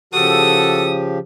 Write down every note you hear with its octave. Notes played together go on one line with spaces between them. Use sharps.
C#3 F3 F#4 G4 A4 D#6